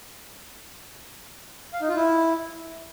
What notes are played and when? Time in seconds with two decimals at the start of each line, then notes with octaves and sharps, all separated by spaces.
1.73 F5
1.81 D#4
1.89 F4
1.96 E4